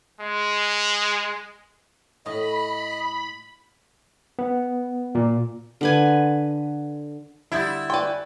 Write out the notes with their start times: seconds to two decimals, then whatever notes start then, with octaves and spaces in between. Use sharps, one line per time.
0.20 G#3
2.26 A2 D#5 B5
4.39 B3
5.15 A#2
5.81 D3 B4 G#5
7.52 D3 G3 E4 C6 D#6 G6 A6
7.90 B4 D5 G5 G#5 C#6